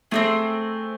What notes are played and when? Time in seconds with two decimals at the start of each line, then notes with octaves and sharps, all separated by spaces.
0.11 A3 C4 D#4 G#4